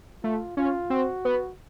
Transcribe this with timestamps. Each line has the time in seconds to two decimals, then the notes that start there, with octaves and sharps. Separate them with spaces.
0.23 A3 F4
0.57 C#4 F4
0.90 C4 F#4
1.25 B3